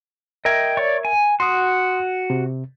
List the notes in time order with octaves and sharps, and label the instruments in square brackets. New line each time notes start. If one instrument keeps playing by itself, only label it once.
[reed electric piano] A#4 E5 G#6 [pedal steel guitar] D#5 G5
[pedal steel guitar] C#5 D5 C#6
G#5
[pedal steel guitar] F#4 [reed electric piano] C6 D#6
[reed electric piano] C3